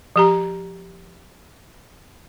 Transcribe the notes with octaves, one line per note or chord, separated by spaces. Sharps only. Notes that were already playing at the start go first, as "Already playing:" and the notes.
F3 G4 A#5